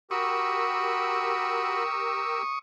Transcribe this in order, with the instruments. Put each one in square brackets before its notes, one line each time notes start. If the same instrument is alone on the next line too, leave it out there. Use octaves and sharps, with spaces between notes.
[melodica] F#4 B5 [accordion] G4 A#4 E6 [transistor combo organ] C#6 D#6